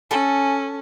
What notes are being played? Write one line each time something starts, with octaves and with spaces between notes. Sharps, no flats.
C#4 A4 G#5